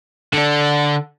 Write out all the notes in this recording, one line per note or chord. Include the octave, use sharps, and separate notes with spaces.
D3 D4